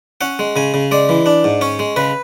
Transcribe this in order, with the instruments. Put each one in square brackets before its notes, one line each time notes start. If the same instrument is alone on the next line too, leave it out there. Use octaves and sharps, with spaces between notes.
[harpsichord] C#4 F#5
G#3
C#3 G#5
C#3
G#3 D5
E3
D4
G#2
C#4 C#5
G#3
C#3 B4